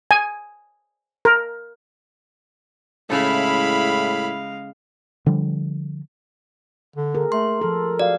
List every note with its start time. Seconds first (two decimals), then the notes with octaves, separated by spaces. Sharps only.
0.11 G#5
1.25 A#4
3.10 A2 C#3 G#3 E4 A4 F5 B5
5.26 D3 F3 G3
6.96 D3
7.15 G#4 A#4
7.32 A3 C6
7.61 F3 A4 A#4
7.99 F#4 D5 F5